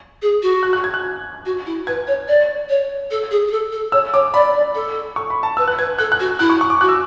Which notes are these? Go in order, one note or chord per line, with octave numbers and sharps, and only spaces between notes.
G#4
F#4
F#6
F#6
G#6
F#6
F#4
E4
B4 G#6
C#5
D5
C#5
A4
G#4
G#4
A4
A4
C#5 E6
C#5 D6
D5 B5
D5
A4
C#6
B5
A5
B4 E6
F#6
B4 G#6
A4 F#6
F#6
F#4
E4 F#6
C#6
C#6
D6
F#4 F#6
E6